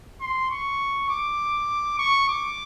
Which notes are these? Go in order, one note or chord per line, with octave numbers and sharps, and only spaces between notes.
C6
C#6
D6
C#6
D6